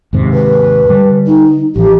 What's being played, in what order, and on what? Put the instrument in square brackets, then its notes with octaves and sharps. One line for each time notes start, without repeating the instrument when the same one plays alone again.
[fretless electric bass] D#2 G#2 C3
[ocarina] B4
[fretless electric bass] D3 G3
[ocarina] D#4
[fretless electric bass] A1 F3 [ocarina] G4